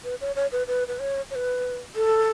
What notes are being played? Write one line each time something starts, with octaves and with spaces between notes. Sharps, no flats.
B4
C#5
C#5
B4
B4
B4
C#5
C#5
B4
A4